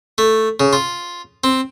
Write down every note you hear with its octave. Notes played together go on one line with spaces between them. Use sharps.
A3
C#3
F4
C4